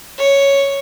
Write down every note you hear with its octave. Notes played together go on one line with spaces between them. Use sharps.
C#5